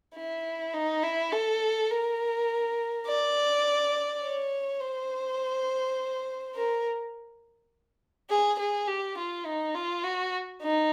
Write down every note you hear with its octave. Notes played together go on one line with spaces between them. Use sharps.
E4
D#4
E4
A4
A#4
D5
C#5
C5
A#4
G#4
G#4
G4
F4
D#4
F4
F#4
D#4